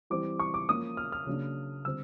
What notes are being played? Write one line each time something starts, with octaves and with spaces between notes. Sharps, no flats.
E3 G3 C4 D6
C#6
D6
F3 A#3 C#4 D#6
F6
F6
C#3 F#3 A#3 D4
D3 G3 C4 E6